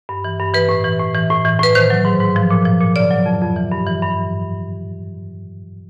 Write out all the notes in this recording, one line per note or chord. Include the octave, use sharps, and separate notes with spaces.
G2
E3
G2
E3 B4
A2
E3
A2
E3
A2
E3
A2 B4
D#3 C5
F#3
G#2
G#2
F3
A#2
F3
A#2
C#3 D5
F#3
F2
F2
E3
G2
E3
G2